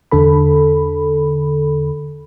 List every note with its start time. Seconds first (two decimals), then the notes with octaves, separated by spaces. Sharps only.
0.11 E2 D3 A4 B5